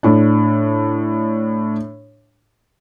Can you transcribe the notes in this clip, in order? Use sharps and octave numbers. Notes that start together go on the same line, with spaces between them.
A2 D4